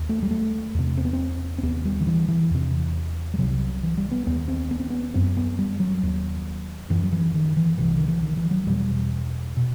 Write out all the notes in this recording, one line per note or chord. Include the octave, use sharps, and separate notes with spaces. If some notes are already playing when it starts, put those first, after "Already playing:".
Already playing: D#2
A3
G3
A3
E2 C3
C4
B3
C4
C4
D#2 B3
G3
D#3
E3
E3
E2 C3
G3
C2 C3 F#3
E3
G3
B3
D#2 B3
C4
B3
C4
B3
F#2 C4
B3
G3
F#3
D#2
F#2 E3
F#3
E3
D#3
E3
C2 C3 E3
D#3
E3
D#3
E3
F#3
E2 B2 G3
B2